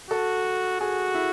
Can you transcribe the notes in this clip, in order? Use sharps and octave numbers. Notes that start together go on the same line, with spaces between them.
F#4 A4
F#4 G#4
E4